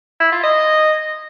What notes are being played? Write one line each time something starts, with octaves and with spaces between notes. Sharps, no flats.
E4
F4
D#5